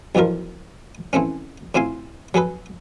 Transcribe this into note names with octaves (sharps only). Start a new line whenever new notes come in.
B1 E2 B2 F3 A#4
E3 A3 C4 C#4
A2 C4 F4 G#5 C6
F#3 G#4 A4 B4